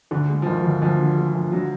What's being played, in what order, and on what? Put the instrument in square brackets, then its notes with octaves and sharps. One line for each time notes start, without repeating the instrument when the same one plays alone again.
[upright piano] D2 [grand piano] D3
[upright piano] G#3
[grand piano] F3
[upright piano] D2 [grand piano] D#3
[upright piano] D2
[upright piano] D2 [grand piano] F3
[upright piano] D3
G#3
D2
[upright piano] D3 [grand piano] F#3